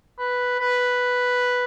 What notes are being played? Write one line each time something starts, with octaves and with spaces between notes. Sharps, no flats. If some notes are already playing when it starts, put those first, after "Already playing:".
B4
B4